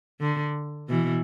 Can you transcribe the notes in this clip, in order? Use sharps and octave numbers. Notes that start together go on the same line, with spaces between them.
D3
B2 E3